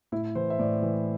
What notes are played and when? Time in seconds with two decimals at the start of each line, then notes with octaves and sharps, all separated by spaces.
0.12 A2 E4
0.35 E3 C5
0.50 E5
0.59 A2 D5
0.82 E3